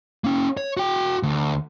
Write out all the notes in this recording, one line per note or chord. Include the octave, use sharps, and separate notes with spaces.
A#3 C#4
C#5
F#4 G5
D2